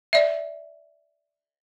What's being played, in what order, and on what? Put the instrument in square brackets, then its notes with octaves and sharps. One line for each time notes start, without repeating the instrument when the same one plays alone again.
[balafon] D5 E5